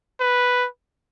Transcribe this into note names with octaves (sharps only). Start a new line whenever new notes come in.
B4